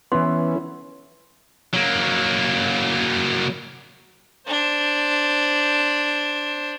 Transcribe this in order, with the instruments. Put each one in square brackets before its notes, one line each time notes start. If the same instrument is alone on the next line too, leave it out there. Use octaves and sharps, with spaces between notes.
[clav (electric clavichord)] E3 B3 [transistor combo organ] C#4 E4 [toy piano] F#5 C6
[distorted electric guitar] F#3 A#3
[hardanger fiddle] D4 C5